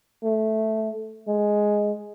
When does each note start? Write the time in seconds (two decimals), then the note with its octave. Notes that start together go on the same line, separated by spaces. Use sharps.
0.24 A3
1.28 G#3